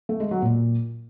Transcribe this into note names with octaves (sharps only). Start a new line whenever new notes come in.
A3
G#3
F#3
A#2